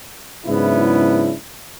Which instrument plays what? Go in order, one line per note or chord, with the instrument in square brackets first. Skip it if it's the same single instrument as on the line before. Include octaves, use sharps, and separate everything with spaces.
[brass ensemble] G#2 C#3 F#3 B3 D4 E4